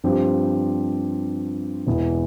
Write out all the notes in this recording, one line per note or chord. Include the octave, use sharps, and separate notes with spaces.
G2 F3 C4 G4
E1 E2 E3